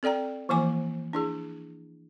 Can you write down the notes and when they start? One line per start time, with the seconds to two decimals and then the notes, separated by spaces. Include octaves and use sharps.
0.03 C4 A4 D5 G5 A#5
0.49 E3 F3 A#3 E4 G#5 D6
1.13 D4 E4 G#4